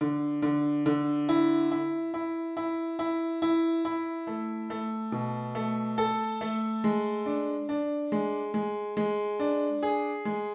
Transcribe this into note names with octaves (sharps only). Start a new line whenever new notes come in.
D3
D3
D3
E4
E4
E4
E4
E4
E4
E4
A3
A3
B2
A3
A4
A3
G#3
D4
D4
G#3
G#3
G#3
D4
G#4
G#3